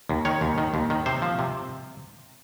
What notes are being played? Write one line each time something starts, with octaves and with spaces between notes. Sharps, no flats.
D#2
D#3 C#5
D#2
D#3
D#2
D#3
C3 C5
F3
C3